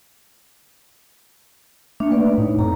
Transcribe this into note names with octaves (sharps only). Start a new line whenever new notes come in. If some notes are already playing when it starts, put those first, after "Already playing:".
A3 A#3 D4
B4 D5
A2 D#4
F2 A#5